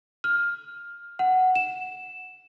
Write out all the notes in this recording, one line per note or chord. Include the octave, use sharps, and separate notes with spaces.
F6
F#5
E7